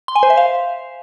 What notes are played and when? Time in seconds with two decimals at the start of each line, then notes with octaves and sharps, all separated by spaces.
0.08 C6
0.16 G#5
0.23 C5
0.30 E5
0.37 F5